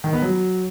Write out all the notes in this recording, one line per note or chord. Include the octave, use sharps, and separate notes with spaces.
D#3
B3
F#3